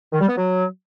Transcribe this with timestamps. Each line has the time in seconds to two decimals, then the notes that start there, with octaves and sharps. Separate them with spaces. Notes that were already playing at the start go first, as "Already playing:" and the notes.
0.13 D#3
0.21 G3
0.29 B3
0.37 F#3